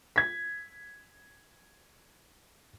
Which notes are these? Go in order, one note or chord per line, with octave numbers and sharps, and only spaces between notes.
G#6 B6